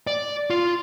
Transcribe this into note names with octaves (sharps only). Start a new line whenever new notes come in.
D5
F4